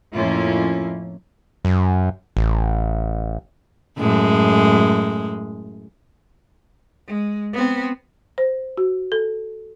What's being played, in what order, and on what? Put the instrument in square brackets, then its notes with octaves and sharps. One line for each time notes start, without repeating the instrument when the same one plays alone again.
[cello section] F2 A2 A#3 C#4 E4 F4
[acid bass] F#2
A1
[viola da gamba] F#2 A2 G#3
[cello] G#3
B3 C4
[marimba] C5
F#4
A4